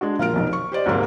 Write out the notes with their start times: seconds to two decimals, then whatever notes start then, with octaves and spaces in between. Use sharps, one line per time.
0.01 G#3 D4 F#4
0.19 A#1 F4 A#4 F5 F6 D7
0.33 F1 B1 D#4
0.53 C#6
0.72 G4 C5 D5 D#5
0.86 D2 G#2 C3 F#3 G3 A#3